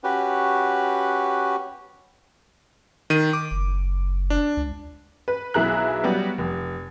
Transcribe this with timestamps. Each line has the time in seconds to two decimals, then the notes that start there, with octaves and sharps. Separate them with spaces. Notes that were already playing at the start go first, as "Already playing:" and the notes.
0.04 C#4 F#4 G4 B4
3.10 D#3 D#7
3.33 D6
3.51 F#1
4.30 D4
4.57 C#2
5.28 B4
5.54 B1 B3 E4 G#4 A#5 F#6
6.03 F#3 G3 B3
6.38 F1